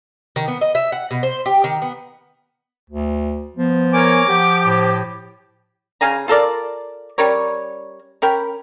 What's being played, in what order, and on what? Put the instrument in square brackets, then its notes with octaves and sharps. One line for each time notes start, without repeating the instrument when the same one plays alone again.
[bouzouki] D#3
B3
D#5
E5
F#5
B2
C5
G4
D#3
B3
[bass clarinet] D2
[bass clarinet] F3 [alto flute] B3
[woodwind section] A#4 C#5 G#5 [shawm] D6
[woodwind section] F3 G4 [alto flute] F#5
[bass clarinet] A2 [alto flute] C5
[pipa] C#3 F5 G#5 A#5
F4 A4 A#4 D5
G3 C#4 A#4 C#5
C#4 A#4 G5 B5